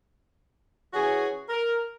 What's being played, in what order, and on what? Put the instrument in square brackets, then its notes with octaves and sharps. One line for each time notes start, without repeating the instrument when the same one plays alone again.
[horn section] E3 C#4 F#4 G#4 C#5 G#5
A#4